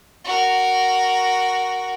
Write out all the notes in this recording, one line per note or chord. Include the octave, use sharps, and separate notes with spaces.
F#4 A#4